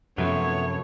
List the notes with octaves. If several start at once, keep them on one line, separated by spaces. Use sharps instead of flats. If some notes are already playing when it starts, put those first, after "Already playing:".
F#2 C3 F3 F#3 A3 B3 C#5